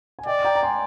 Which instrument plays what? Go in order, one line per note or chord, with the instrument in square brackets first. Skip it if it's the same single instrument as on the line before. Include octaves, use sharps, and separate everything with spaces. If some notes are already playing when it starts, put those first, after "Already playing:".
[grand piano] G#5
[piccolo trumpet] D5 [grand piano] D#5 G5
[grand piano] G5 A#5
A#5
G#5 C6